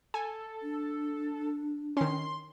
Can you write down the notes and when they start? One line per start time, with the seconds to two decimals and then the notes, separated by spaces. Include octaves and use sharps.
0.14 A4 G#5
0.62 D4
1.97 D#3 C#4 C6